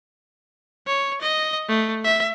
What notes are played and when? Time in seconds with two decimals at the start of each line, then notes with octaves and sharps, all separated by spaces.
0.87 C#5
1.21 D#5
1.69 A3
2.04 E5